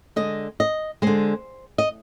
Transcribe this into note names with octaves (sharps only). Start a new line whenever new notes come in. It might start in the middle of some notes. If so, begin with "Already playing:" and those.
D3 G#3 D#5
D#5
D3 G#3 C5
D#5